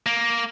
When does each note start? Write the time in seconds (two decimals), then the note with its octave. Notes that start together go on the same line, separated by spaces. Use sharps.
0.06 A#3